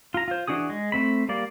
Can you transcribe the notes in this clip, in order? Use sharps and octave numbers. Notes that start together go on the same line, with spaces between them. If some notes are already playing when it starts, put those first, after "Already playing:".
F4 A#5
F4 C5
E3 D4 F#4 G#4 D#6
G#3
A3 C4 B5
G3 A#3 D5